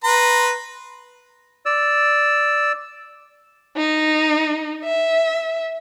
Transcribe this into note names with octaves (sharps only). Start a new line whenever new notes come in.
B4 A#5 C6
D5 E6
D#4
E5